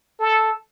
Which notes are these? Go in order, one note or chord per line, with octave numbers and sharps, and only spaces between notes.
A4